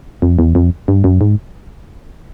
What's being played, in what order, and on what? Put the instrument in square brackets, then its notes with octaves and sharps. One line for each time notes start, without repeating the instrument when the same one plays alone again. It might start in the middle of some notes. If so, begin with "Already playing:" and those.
[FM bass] F2
E2
F2
G2
F#2
G#2